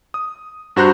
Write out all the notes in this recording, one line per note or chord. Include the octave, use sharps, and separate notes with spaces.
D#6
G2 F#4 C5 A#5 F#6 G6